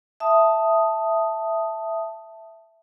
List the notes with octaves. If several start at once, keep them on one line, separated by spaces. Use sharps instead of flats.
E5 A5 D#6